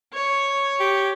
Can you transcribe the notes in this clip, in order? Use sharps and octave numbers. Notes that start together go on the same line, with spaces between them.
C#5
G4